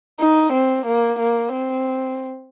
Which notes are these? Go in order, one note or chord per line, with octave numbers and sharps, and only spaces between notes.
D#4
C4
A#3
A#3
C4